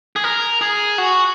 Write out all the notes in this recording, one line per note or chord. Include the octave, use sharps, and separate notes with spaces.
G#4
A#4
G#4
F#4